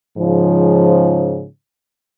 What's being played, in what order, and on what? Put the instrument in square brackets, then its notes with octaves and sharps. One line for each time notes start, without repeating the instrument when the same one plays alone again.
[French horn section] G#2 C#3 F3